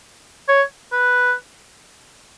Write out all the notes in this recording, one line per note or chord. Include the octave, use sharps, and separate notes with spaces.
C#5
B4